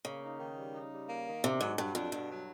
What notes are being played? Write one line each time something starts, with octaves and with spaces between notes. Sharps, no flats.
C#3 A#3
D#4
D#3
G3
D#4
G3
A#3
D#3
C3 D4
G#2 F#3
G2 F#3
F2 D4
G2 B2
F#3